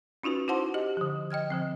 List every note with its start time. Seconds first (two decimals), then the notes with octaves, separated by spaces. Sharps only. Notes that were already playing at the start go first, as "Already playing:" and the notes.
0.23 C#4 D#4 F4 F#4 B4
0.48 E4 F#4 C5 F#5 A5 C6
0.74 G4 D#5
0.97 D3 F3
1.31 D#5 G5 F6 G#6
1.50 D3 F3 C4